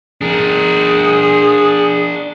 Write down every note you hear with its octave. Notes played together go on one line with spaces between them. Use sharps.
D4 G#4 A#4